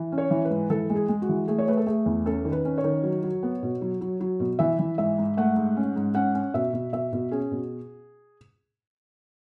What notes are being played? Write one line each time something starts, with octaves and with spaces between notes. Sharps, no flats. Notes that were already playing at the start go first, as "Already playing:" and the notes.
Already playing: E3
C#4
C#5
E3
B4
G#2
E3 A4
G#3
G#4
G#3
F#4
E3
A3 G#4
C#5
A3 B4
A4
A3 G#4
E2
C#4 A4
D#3
B4
C#4
C#5
D#3
F#3
F#3
B3
B2
F#3
F#3
F#3
B2
E3 E5
E3
G#2 E5
G#2
A3 F#5
G#2
C#4
G#2
C#4 F#5
C#4
B2 E5
B2
B2 E5
B2
C#4 G#4
B2